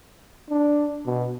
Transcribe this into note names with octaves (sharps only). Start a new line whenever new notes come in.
D4
B2